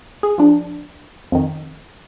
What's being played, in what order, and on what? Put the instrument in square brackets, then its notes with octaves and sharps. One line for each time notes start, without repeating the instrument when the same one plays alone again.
[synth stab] G#4
F3 D4
F2 D#3